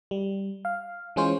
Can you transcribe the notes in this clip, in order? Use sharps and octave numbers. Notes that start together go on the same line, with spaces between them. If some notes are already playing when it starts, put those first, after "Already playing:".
G3
F5
E3 G#3 C#4 F4 C5